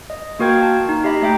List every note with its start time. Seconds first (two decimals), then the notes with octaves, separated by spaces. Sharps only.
0.10 D#5
0.39 A#3 F#4 A#4 G5 G#6
0.62 A5
0.89 D#4
1.04 G4 D#5 E5 B5
1.22 A3 E5 G5 A#5